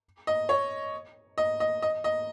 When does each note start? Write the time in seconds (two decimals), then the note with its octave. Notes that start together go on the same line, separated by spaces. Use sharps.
0.27 D#5
0.49 C#5
1.38 D#5
1.60 D#5
1.82 D#5
2.04 D#5